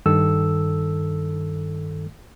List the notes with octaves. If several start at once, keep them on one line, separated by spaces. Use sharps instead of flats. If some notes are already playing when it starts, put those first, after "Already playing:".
G2 D#3 A4 E6